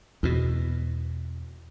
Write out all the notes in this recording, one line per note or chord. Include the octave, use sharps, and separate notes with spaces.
E2 B2